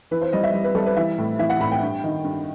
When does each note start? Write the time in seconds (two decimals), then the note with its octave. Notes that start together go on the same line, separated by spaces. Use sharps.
0.11 E3 B4
0.21 C5
0.33 G3 D#5
0.43 E5
0.54 G3
0.64 B4
0.75 G3 A4
0.86 B4
0.96 E3 E5
1.18 A2
1.39 E3 E5
1.50 F#5
1.60 A2 B5
1.72 G5
1.82 G2
2.04 D#3
2.24 G2